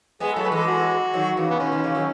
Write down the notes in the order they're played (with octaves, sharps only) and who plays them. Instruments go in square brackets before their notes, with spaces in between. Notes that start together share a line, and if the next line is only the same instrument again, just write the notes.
[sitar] G#3 B3 [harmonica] G#4
[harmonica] A4
[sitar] F#3 A3
[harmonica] B4
[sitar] E3 G#3 [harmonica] A4
[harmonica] F#4
[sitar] D#3 F#3
C#3 E3
[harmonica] B3
[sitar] B2 D#3 [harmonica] C#4
[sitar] B2 D#3
C#3 E3
D#3 F#3